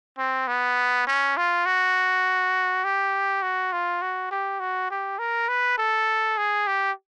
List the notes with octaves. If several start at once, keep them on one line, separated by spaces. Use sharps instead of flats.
C4
B3
C#4
F4
F#4
G4
F#4
F4
F#4
G4
F#4
G4
A#4
B4
A4
G#4
G4